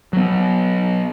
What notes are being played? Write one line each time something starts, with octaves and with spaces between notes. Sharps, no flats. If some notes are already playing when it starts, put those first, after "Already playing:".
F#3 B3